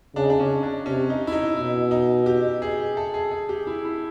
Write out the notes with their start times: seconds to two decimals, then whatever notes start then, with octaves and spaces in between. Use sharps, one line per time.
0.16 C#3 D4
0.24 D#4
0.30 D4
0.40 C#4
0.63 D4
0.86 C3 C#4
1.10 D#4
1.27 E4
1.33 D#4
1.56 B2 E4
1.91 D#4
2.26 G4
2.62 G#4
2.97 A4
3.14 G#4
3.31 G#4
3.49 G4
3.67 E4
3.85 E4